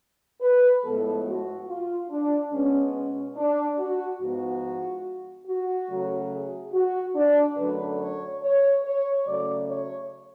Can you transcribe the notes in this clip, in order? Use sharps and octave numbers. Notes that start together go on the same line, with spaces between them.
B4
A2 F3 G#3 B3 A4
F#4
F4
D4
B2 G#3 B3 C#4
C#4
D4
F#4
G#2 F3 B3 F#4
F#4
C#3 F#3 A3
G#4
F#4
D4
F#2 D3 F#3 A3 B4
C#5
C#5
C#5
C#3 F#3 A3 D5
C#5